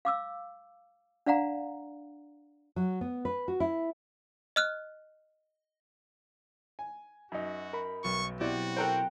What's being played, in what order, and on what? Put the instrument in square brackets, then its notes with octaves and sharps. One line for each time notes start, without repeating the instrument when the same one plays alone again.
[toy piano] F5 D6 E6
D4 D5 F5 F#5 A#5
[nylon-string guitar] F#3
B3
B4
F#4
E4
[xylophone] D#5 F6 F#6
[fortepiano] G#5
[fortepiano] F#2 D#4 [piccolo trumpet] F#4
[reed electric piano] A#4 B5
[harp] B1 [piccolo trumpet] C#6
[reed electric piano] B2 E4 [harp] B3 C4 G4 [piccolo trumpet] F#4 [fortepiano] D5
[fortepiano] A4 A#4 C5 [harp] G5 A#5 F#6